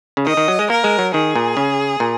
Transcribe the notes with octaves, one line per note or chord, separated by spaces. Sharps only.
C#3
D#3 D#5
D#3
F#3
G#3
A#3 A#4
G#3
F#3
D#3 G#4
A#2
C#3
A#2